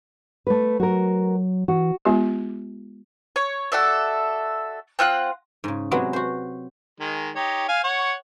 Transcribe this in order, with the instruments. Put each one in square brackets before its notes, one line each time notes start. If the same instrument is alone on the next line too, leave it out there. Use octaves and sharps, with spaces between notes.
[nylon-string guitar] A3 B4
[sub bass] F#3 [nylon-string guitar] F#4 A#4
[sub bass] E3 [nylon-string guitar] F#4
[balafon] G#3 B3 F4 G4
[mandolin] C#5
F#4 A4 D5 E5
C4 F4 F#5 F#6
[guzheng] G#2 C#3
C3 F#3 G#3 B3 C4 F#4
F#4 C5
[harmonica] D#3 G#3
D#4 G4 C#5
F5 G#5
C#5 F#5 C#6